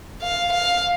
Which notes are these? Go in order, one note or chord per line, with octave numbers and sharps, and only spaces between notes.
F5
F5